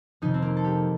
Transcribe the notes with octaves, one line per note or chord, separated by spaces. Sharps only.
F2 C3 D#3 D#4
C4
A#3
A4
G4